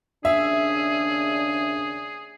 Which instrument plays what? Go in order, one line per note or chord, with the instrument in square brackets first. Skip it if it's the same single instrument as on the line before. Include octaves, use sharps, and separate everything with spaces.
[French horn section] D#2 C#3 D4 [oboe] G#4 [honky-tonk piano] E5